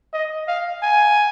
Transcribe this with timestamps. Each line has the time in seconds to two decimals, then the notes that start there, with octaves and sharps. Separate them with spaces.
0.13 D#5
0.48 F5
0.82 G#5